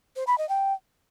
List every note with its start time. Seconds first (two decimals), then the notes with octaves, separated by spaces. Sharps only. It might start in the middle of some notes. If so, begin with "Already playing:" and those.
0.16 C5
0.27 B5
0.38 D#5
0.49 G5